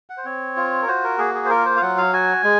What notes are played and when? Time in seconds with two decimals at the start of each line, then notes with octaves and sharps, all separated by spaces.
0.10 F#5
0.18 C5
0.25 C4 C#5
0.56 F4
0.82 A#4
0.88 F#4 C5
1.04 A#4
1.18 A#3 G#4
1.34 G#4
1.45 C5
1.50 F4 A#4
1.66 C5
1.76 F5
1.82 F#3 F#5
1.98 F5
2.13 F#4 G#5
2.44 G#3